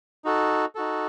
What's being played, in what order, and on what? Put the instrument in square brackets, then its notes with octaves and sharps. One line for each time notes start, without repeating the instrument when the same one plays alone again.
[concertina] D#4 F#4 A4
D#4 F#4 A4